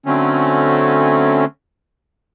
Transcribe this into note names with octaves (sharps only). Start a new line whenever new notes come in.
D3 F#3 A3 C4 C#4